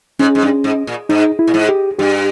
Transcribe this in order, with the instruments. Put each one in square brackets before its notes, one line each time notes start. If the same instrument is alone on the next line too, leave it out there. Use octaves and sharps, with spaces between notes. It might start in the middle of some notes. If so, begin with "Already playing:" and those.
[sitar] G#2 [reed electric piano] C#4
[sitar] G#2
G2
G#2
A#2
[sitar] G#2 [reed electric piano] D#4
[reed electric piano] E4
[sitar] A#2
G#2
[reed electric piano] G4
[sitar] G2 [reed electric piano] G4